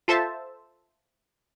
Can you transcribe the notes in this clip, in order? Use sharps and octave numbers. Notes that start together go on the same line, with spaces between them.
F4 A4 C5 E5 A5